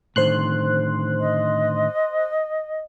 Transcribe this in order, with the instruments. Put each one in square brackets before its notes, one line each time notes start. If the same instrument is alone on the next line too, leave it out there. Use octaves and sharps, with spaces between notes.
[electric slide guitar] A2 D3 D#3 [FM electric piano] C5 C6 F#6
[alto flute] D#5